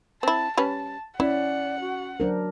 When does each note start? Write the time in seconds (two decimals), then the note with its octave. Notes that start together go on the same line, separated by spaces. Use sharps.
0.23 C4 E4 A5
0.57 G3 C#4 B4 A5
1.20 C#4 E4 D5 F#5
1.80 F#4
2.20 F#3 D4 A#4 C5